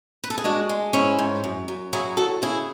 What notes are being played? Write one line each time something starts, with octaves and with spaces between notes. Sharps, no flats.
B4
A4
G#4
G#3 D4 F#4
G#3
G#2 C#4 E4
G#2
F#2
F#2
F#3 E4 G#4
E2 F#4 A4
C#3 E4 G#4